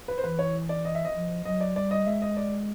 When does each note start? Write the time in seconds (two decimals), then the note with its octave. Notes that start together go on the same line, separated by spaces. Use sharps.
0.08 B4
0.18 C5
0.23 E3 B4
0.39 C#5
0.69 D5
0.85 D#5
0.95 E5
1.05 D#5
1.15 F3
1.45 F#3 D#5
1.61 D5
1.76 G3 D5
1.91 D#5
2.06 G#3 E5
2.22 D#5
2.37 D5